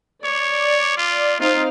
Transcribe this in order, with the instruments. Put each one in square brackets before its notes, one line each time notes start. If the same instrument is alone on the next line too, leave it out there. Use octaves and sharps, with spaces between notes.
[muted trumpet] C#5 [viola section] D5
[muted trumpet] F4
[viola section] C4 D#4 F5 [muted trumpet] F4